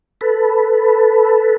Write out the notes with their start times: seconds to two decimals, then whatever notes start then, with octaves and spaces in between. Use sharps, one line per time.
0.21 A4 B4